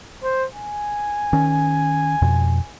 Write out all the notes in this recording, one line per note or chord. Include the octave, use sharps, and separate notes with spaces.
C5
G#5
D#3 C#4
F2 B2